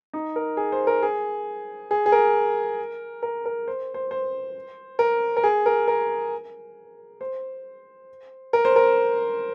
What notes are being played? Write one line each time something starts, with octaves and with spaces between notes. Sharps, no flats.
D#4
A#4
G#4
C5
A#4
G#4
G#4
G#4
A#4
A#4
A#4
C5
C5
C5
A#4
A#4
G#4
A#4
A#4
C5
A#4
C5
A#4